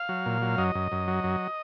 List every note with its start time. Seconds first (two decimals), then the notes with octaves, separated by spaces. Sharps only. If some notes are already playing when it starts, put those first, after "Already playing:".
Already playing: F5
0.09 F#3
0.26 A#2
0.42 F#3
0.58 F#2 D#5
0.75 F#2
0.92 F#2
1.07 F#3
1.24 F#2